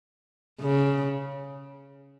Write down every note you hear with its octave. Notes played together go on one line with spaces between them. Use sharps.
C#3